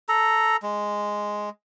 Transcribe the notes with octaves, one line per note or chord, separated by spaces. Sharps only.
A4 A#5
G#3